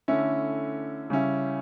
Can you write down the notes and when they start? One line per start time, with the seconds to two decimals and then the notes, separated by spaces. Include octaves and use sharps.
0.08 D3 A3 C#4 E4
1.10 C#3 G3 C#4 E4